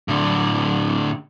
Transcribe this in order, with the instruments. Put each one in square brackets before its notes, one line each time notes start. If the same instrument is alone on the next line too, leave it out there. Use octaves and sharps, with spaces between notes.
[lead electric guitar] A2 D3